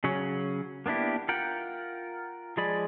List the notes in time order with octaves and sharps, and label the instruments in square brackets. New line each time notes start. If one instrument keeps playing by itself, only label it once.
[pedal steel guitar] C#3 F#3 C#4
A#3 B3 D4 E4 G4
F4 A#4 F#5 G5
F3 G#3 G#4 D5 B5